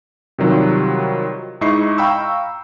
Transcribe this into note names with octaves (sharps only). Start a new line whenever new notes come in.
C3 D#3 F#3 G3 F4
G#2 D#4 E4 D#5 C#6 C7
F5 G5 A#5 B5 C#6 E6